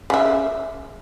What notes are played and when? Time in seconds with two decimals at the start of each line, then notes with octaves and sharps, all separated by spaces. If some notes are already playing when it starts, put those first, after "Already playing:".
0.10 C#3 E5